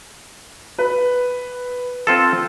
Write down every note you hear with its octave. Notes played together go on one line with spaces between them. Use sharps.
B4
C4 F4 A4